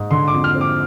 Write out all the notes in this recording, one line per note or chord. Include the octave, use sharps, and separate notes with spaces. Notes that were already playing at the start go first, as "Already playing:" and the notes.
Already playing: G#2
D3 C6
D6
F2
F6
C4
D6